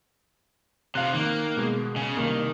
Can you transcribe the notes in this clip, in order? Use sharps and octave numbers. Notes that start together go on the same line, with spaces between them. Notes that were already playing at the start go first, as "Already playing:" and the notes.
C3 F3 F5 F#6
D#3 A#3
B2 G#3 B3
C#3
C2 D#3 A#3